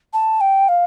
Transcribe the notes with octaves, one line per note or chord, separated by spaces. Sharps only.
A5
G5
F5